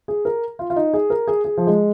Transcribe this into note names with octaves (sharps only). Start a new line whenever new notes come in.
G#4
A#4
F4
F4
D#4
G#4
A#4
G#4
G#4
F3
G#3